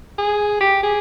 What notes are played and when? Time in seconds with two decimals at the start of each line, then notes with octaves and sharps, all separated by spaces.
0.18 G#4
0.61 G4
0.83 G#4